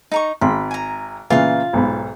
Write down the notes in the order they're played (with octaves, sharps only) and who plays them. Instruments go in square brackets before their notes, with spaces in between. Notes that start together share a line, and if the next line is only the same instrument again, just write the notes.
[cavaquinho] D#4 A#5 C#6
[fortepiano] G#1 C6 [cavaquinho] B5
[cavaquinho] G#5 A#5
[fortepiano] A#2 C#3 E3 [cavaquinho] F4 F5
[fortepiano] B1 G#2 B5